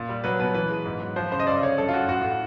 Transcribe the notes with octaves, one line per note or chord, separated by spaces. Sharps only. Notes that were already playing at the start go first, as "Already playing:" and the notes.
Already playing: A#2
G3
F#3 B4
B2 B4
E3 B4
G#3
G#2
F#3
F3 C5
C#3 C5
D#5
G2 D5
D3 C#5
F#2 A4
F4
F#2 F#4
A2 F#4
A2